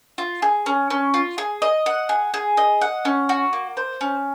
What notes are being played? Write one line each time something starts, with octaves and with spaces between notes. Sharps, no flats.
F4
G#4
C#4
C#4
F4
G#4
D#5
F#5
G#4
G#4
D#5
F#5
C#4
F#4
A#3
C5
C#4